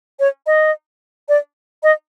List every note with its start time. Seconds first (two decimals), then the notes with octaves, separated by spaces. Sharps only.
0.20 C#5
0.47 D#5
1.29 D5
1.83 D#5